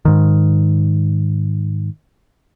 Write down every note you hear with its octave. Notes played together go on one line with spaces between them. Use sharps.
G#2 D#3